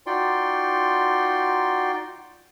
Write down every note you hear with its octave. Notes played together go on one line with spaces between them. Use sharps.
D#4 F4 F#4 D5 G5 C6